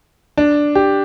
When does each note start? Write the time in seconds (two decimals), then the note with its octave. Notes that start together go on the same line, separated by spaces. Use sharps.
0.37 D4
0.75 G4